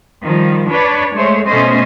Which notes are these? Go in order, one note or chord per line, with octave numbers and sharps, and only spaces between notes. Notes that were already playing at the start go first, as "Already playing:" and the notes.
D#3 F3 G3
D4 B4 C#5 D5
G#3 A3 C5 C#5
B2 A3 C#4 C5 D#5